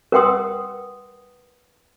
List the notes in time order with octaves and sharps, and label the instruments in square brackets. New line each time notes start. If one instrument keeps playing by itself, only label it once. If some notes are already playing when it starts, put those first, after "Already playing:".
[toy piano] A#4 B4 F#5 G5 C6 D#6